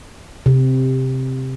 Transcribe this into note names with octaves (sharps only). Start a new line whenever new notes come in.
C3